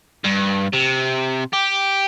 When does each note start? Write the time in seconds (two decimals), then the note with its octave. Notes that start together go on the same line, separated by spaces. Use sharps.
0.25 G2
0.73 C3
1.53 G4